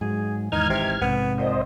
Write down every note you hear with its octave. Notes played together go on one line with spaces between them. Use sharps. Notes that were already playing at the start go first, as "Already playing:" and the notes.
G#2 F#3 G#4
E2 G#2 D#3 E3 D#4 F6 G#6
G#1 C3
A#1 G#2 C3 B3
A#2 C5 D#5